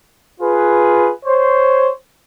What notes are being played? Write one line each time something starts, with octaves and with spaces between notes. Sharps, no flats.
F4 G#4 B4
C5 C#5